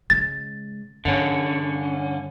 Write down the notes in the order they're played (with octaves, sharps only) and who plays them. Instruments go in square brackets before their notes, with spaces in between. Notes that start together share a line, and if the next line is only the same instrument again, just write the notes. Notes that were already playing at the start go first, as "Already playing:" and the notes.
[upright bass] C#3 G#3 [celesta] A6
[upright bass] G2 [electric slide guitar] D3 C#4